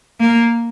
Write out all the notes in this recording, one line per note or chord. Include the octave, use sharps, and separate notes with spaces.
A#3